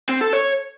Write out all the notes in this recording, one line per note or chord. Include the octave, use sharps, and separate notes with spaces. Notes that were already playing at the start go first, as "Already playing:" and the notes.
C4
A4
C#5